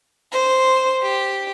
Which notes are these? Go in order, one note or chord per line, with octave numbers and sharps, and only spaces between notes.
C5
G4